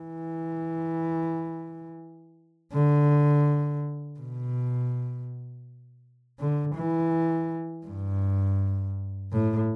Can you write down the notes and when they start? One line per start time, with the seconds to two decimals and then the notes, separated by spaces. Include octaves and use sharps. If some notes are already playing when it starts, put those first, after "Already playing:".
Already playing: E3
2.73 D3
4.20 B2
6.40 D3
6.75 E3
7.86 G2
9.32 A2